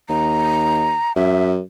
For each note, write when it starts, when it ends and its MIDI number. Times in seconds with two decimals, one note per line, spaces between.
0.09 0.95 39
0.09 1.12 82
1.16 1.60 42
1.16 1.49 76